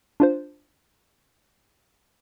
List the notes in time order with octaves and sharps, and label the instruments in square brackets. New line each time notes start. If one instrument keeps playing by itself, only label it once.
[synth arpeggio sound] D4 F4 C5